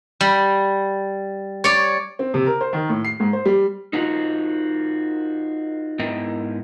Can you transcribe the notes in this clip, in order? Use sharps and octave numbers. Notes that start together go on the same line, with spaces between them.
G3
C#5 D5
C4
C3
A#4
C5
D#3
A2
C7
G#2
C5
G3
D#4 F4 F#4 A#4 C5
G#2 B3 E4 A#4 D#5 G5